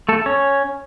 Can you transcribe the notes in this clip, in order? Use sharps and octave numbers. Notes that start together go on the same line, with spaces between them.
A3 A4
C#4 C#5